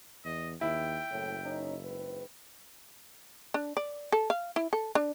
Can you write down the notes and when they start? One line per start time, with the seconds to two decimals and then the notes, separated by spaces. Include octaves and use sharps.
0.25 E2 D#5
0.61 D#2 E4 G5
1.10 F#1 A2
1.44 C#4 D#4
1.84 G#2 C4 B4
3.54 D4
3.77 D5
4.12 A4
4.30 F5
4.56 E4
4.73 A4
4.95 D4